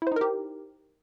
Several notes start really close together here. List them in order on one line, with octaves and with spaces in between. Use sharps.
E4 C5 D#4 A#4 G4